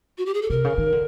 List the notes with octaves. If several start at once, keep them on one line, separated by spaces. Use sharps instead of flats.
F#4
G4
G#4
A4
C3 A#4
C#3
D#3
D3